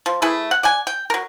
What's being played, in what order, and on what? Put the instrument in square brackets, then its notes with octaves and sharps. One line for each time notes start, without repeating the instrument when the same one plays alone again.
[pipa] F3
A3 E4 G#4 B4
F#5
D5 F#5 G#5
G5
F#3 A#4